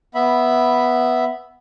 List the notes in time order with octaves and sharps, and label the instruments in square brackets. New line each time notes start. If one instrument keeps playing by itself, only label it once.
[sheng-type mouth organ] B3 E5 B5